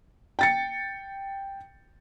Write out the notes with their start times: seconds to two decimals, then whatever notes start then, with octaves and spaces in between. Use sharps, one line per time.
0.39 G5 A6 C#7